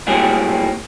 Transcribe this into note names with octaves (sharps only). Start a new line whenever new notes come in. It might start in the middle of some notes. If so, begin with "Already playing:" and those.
A2 F#3 G3 A#3 C4 G#4